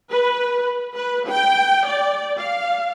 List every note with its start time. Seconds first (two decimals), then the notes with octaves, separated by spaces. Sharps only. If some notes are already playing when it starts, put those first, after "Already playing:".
0.12 B4
0.94 B4
1.28 G5
1.86 D5
2.37 F5